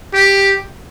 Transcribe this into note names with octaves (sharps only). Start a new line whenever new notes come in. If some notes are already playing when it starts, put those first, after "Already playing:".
G4